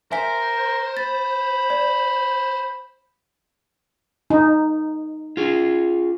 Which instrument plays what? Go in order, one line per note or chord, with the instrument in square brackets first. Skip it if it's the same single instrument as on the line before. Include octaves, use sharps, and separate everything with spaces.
[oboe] A#4 [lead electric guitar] C5 [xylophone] E5 G#5 B6
[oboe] B5 [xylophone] A6
[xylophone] D5
[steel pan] D#4
[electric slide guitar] F4 G#4